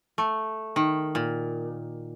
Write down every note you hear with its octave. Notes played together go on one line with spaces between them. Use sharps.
A3
D#3
A#2